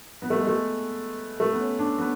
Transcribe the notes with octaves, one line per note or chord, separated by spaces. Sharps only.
B3
A3
G#3
A3
A3
B3
C#4
D4
B3